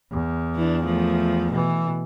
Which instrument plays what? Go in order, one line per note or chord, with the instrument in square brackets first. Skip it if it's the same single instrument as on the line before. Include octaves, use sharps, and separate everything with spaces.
[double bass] E2
[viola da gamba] E3 D4
F3 A3
[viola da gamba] B2 [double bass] E3